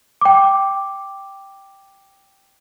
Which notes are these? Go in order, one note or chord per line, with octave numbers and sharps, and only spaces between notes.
G5 D6